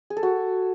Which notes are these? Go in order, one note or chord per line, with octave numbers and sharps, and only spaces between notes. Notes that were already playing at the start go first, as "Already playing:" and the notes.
G#4
A4
F#4